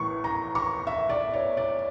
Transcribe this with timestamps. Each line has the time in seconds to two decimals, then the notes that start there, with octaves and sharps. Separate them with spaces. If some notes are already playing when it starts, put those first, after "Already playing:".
Already playing: A1 A2 E3 C#6
0.24 A#5
0.55 C#6
0.87 E5
1.09 D5
1.33 C#5
1.57 D5